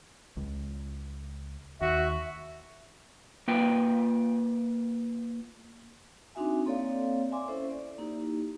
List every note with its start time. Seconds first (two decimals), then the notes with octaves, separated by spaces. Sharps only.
0.37 C#2
1.81 D#2 F#4 E5
3.48 A#3 F4 B4 E5 G5
6.35 C4 D4 D#4 F#4 E5 G#5
6.66 A#3 C4 A4 C#5 D5 F5
7.31 D5 E5 G#5 C6 D6
7.48 C#4 E4 A4 C5 E5
7.70 D5
7.98 A#3 D#4 E4 G4